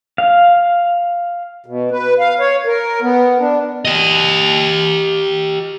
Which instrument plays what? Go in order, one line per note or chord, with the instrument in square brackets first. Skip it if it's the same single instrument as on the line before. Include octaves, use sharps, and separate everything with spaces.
[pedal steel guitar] F5
[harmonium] B2
B4
F5
C#5
A#4
B3
D4
[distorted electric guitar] G4 D#5